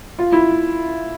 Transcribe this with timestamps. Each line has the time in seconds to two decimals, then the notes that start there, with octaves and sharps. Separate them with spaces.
0.19 F4
0.32 E4